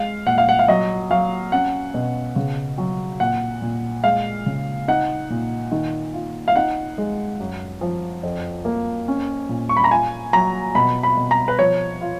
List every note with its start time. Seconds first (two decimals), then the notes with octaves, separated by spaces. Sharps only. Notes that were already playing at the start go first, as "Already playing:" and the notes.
Already playing: G#3 F5
0.26 A#2 F#5
0.38 F5
0.49 F#5
0.59 F5
0.68 F#3 D#5
1.10 F#3 F5
1.52 C#4 F#5
1.94 B2
2.36 C#3
2.78 F#3
3.20 A#2 F#5
3.62 A#2
4.04 G#3 F5
4.46 C#3
4.88 D#4 F#5
5.30 A#2
5.72 D#3
6.14 F4
6.48 F5
6.56 D#4 F#5
6.98 G#3
7.40 F#2
7.81 F3
8.23 F2
8.65 A#3
9.08 C#4
9.49 A#2
9.69 C#6
9.77 B5
9.84 A#5
9.91 F4 G#5
10.33 F#3 A#5
10.75 B2 B5
11.03 B5
11.17 B2
11.31 A#5
11.48 B4
11.59 F3 C#5
12.01 F4